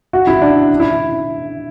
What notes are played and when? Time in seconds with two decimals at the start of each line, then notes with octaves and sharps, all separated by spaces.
0.13 F#4
0.27 E4
0.42 D4
0.80 E4